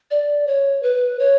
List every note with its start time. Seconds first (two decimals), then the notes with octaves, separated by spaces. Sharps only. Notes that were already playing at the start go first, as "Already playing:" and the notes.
0.11 D5
0.47 C#5
0.83 B4
1.19 C#5